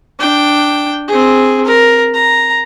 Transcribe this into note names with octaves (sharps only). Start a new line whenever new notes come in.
D4 G5
C4 G#4
A#4
A#5